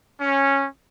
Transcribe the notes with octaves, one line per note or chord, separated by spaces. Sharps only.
C#4